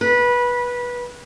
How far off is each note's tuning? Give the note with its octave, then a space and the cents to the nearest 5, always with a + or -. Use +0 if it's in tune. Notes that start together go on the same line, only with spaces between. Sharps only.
B4 -20